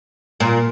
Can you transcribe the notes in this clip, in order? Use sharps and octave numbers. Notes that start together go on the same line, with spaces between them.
A#2